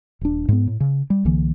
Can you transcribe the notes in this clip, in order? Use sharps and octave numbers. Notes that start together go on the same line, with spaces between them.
D#1 D4
G#2 B3
A2
C#3
G3
C2 D3 E3 A#3